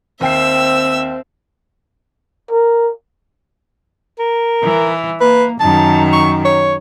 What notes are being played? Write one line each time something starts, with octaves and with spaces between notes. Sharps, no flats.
D#2 C4 E5 G5 E6 C7
A#4
A#4
E3
A#3 B4
F#2 D#3 A5
C#6
C#5